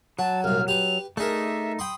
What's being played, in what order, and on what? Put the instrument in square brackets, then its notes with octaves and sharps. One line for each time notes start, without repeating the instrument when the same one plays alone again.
[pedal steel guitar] F#3 [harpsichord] F#4 [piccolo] A5
[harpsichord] C2 A#2 [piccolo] F6
[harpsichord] G4 B4 [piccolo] F7
[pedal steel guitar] A3 D#4 [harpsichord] D4 G#4 A#4 [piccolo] E5
[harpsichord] G5 B5 C6 [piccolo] D#6